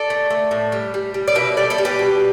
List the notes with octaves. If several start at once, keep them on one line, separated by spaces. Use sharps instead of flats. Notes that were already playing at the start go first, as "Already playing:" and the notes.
Already playing: A4 D5
A3
A3
A2
G3
G3
G3
D5
B2 B4 E5
G3 A4 D5
A4 D5
G3
G4 B4
B2